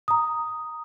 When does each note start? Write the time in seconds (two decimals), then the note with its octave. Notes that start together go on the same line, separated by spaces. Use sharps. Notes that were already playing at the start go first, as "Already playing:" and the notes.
0.08 A#5 D#6